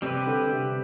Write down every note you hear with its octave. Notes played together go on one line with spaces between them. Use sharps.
C3 G3 C4 G4 B4
D3
C3